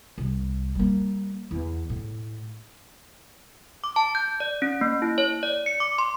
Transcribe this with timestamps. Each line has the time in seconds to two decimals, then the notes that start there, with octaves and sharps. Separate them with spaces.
0.18 C2
0.75 G3 A#3
1.51 E2
1.89 A2
3.84 D6
3.96 A5
4.15 G6
4.40 D5
4.62 C#4
4.81 A#3
5.02 E4
5.18 C#5
5.43 D5
5.66 C#7
5.80 D6
5.98 C6